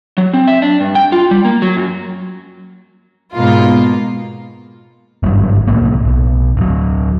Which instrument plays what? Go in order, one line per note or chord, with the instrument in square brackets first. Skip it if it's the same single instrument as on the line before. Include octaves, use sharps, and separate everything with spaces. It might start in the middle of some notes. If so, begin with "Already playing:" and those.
[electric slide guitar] F#3
C4
E5
D4
G2
G5
F4
G3
A#3
F#3
F#2
[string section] G#2 B2 A#3 F4
[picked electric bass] G#1 G2 F#3
C2 A2 A#3
B1
D1 F#3